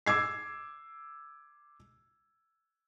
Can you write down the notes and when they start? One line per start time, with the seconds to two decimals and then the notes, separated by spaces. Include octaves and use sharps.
0.06 D6 E6 G#6 C7